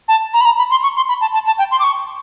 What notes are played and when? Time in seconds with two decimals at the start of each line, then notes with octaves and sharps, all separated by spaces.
0.08 A5
0.33 A#5
0.41 B5
0.45 A#5
0.58 B5
0.71 C6
0.83 C#6
0.96 C6
1.08 B5
1.21 A5
1.33 A5
1.46 A5
1.58 G5
1.71 C6
1.79 D6
1.84 C#6